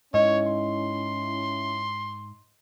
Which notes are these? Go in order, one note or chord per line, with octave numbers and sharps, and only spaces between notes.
G#2 C#4 E4 C#5 D#5
C6